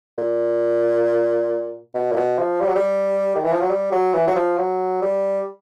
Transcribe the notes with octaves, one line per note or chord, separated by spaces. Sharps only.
A#2
B2
A#2
B2
F3
G3
F#3
G3
D#3
E3
F3
F#3
G3
F#3
E3
F#3
F3
F#3
G3